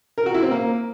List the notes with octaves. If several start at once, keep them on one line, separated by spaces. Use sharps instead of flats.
A#4
F#4
E4
C4
A#3